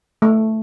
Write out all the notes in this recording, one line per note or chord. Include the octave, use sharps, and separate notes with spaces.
A3